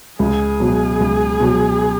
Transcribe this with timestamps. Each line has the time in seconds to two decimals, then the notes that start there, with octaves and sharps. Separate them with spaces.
0.19 C#2 G#4
0.60 B2 F#3
1.00 C#2
1.40 B2 F#3